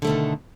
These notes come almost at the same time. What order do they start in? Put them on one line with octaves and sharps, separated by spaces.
D3 A3 B2 D#3